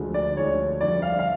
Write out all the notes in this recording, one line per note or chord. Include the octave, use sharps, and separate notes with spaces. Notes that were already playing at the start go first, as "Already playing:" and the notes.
Already playing: D2 D3 F3 G#3
D5
D2 D3 F3 G#3 C#5
F2 D3 G3 D5
F5
F5